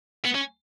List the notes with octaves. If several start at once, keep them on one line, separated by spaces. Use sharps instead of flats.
B3
C#4